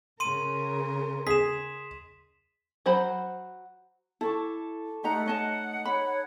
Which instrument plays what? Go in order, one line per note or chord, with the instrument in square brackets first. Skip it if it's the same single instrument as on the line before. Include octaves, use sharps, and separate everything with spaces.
[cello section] C#3 A#4 [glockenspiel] C6 D#7
[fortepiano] G#4 [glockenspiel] B6 E7
[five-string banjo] F#3 C5 F#5 B5
[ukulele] E4 [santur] A4 C#6 D6
[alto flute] A3 [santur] D#4 [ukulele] G4 A#5 [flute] F#5
[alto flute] A3 [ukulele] C#5 D#5 A5
[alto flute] C#5 [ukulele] B5